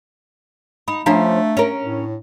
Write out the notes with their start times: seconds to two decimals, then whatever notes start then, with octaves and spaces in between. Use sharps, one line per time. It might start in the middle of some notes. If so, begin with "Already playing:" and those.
0.88 D#4 B5
1.06 F3 A3 C#4 D4 C5 F5 A#5
1.57 C#4 A#4
1.84 A2